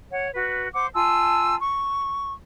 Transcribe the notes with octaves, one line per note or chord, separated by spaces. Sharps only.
C#5 F#5
F#4 B4
C5 F#5 D6
F4 G#5 A5 E6
C#6